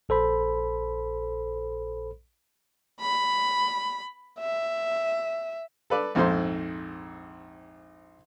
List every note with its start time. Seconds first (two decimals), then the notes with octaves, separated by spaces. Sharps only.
0.09 A#1 A4 C5 B5
3.00 B5
4.40 E5
5.90 A4 B4 D5
6.15 A#1 F2 G#2 D#4 C5 C6